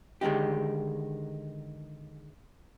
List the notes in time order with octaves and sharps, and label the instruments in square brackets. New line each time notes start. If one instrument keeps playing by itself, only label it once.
[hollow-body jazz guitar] D3 D#3 G#3 D#4 G4